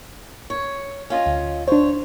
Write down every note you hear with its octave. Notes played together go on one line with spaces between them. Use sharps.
C#5
C#4 F4 D#5
D2
D4 C5 C#5